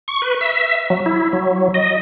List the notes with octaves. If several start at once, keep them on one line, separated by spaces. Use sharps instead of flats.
C#6
B4
E5
F#3
E4
F#3
D#5